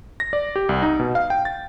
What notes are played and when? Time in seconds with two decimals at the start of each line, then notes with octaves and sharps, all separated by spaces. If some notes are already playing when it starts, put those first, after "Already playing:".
0.20 A#6
0.33 D5
0.56 G4
0.69 C2
0.82 D#4
0.99 B2
1.15 F5
1.30 G5
1.45 A6